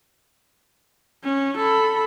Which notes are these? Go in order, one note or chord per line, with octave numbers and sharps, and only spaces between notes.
C#4
A4 B5